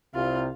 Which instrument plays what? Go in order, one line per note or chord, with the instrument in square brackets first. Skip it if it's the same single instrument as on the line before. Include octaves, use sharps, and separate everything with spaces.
[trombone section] C2 C3 [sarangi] F4